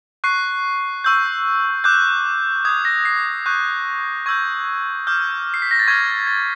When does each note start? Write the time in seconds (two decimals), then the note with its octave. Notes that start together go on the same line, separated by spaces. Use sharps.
0.24 C#6 F#6 C7
1.04 C#6 E6 G6
1.84 D6 F#6 G6
2.65 D#6 G6 G#6
2.85 A#6
3.05 C7
3.46 C#6 F#6 G6
4.26 C#6 E6 G6 G#6
5.07 D6 F6 G6
5.54 C7
5.62 B6
5.71 A#6
5.79 A6
5.88 C#6 F6 G#6
6.27 A6